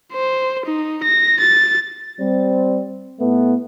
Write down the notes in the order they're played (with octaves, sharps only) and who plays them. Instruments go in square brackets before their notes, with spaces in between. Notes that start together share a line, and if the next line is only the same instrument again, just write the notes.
[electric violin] C5
D#4
A#6
A6
[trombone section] G3 C4
A2 A3 B3